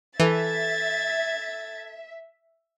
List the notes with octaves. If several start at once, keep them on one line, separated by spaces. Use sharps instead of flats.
E3 A4 E5 G#6 A6